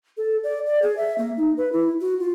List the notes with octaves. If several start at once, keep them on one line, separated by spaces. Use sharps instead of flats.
A4
D5
D5
G#4
E5
A#3
D#4
B4
E4
F#4
F4